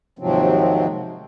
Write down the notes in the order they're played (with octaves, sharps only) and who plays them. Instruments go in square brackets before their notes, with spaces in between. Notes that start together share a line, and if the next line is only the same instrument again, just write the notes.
[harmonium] D#2 G#2 C3 F3 F#3 C4